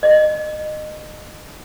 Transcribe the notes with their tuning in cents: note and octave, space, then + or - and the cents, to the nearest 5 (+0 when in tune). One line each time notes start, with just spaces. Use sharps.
D#5 -25